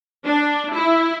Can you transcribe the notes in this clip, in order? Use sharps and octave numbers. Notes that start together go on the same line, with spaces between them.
D4
E4